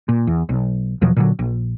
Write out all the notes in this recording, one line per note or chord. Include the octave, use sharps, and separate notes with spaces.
A#2
E2
B1
E2 B2 F3 F#3
A#2 D3 F#3
A#1